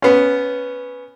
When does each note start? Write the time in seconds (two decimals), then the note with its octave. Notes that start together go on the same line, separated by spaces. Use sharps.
0.02 B3 C#4